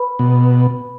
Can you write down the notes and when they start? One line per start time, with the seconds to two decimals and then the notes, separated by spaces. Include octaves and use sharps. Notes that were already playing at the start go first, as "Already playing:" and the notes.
Already playing: B4 B5
0.19 B2